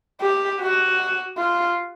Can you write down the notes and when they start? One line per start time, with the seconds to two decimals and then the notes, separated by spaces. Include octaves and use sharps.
0.21 G4
0.61 F#4
1.38 F4